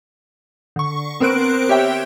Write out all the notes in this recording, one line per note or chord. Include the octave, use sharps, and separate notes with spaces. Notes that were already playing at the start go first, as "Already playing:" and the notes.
D3 C#6
B3 C4 A#4 C5 F#6 D7
G4 C#5 E5 G5